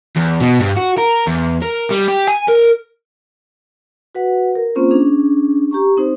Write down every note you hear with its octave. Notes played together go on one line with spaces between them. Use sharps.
E2
B2
G2
F#4
A#4
E2
A#4
G3
G4
G#5
A#4
F#4 B4 F#5
A#4
A#3 C4 C#4 F4 C5
C#4 D4 G#4
G4 A#5 C#6
C4 D#4 C5